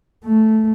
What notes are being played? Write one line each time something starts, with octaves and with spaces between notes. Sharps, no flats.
A3